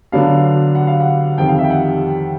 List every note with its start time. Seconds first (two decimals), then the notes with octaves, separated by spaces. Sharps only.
0.12 D3 F#3 B3 D4 F5
0.75 F#5
0.87 F5
1.00 F#5
1.38 F2 C3 D#3 G3 G5
1.48 F5
1.59 E5
1.64 G5
1.70 F#5